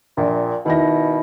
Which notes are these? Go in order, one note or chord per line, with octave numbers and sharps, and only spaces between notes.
A#1 A#2
B2 D#3 E4 A#6